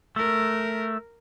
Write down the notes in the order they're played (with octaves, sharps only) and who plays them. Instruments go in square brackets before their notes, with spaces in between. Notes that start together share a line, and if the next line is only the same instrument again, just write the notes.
[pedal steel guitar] A3 [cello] A#4